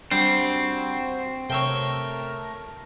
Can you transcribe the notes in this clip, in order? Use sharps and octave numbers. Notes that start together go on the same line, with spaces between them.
G3 C4 D4 F#4 C5
C3 A3 A#4 C#5 E5 G5